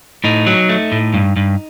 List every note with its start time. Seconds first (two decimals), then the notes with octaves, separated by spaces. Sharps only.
0.24 A2 D#4
0.47 F#3
0.69 A3
0.92 A2
1.14 G2
1.36 G2